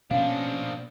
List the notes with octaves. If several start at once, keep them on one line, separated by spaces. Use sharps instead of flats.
B2 F3 A#3 C#4 D4 F5